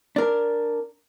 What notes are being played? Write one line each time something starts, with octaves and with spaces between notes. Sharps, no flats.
D4 A#4